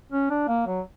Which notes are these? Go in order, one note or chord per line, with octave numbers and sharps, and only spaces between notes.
C#4
D4
A#3
F#3